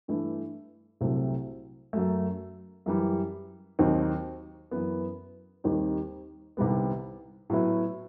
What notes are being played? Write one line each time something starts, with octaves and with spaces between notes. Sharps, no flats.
G2 E3 A3 E4
C2 C3 F#3 A3 C4
F#2 F#3 A3
F#2 E3 G3
D#2 D#3 F#3 C4 D#4
F#2 E3 B3
D#2 D#3 G3 C4 D#4
C2 C3 D#3 G3 B3
A2 F#3 B3 E4